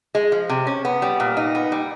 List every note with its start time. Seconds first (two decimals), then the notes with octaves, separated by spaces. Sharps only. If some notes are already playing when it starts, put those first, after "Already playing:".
0.15 G#3
0.32 F3
0.49 C3
0.67 C#4
0.85 B3
1.02 G3
1.20 A#2
1.37 D#4
1.55 B3
1.72 G3